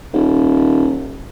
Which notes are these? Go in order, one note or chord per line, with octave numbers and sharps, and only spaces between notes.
D#1